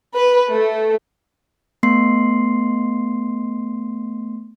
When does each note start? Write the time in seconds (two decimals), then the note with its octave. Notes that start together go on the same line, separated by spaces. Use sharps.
0.13 B4
0.51 A3
1.83 A3 B3 C6 C7